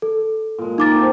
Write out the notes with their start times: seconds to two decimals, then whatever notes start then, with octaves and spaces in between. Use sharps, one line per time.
0.02 A4
0.58 A#2 G#3
0.78 A#3 D#4 G4 A#4 D6 A6
0.94 A3 C4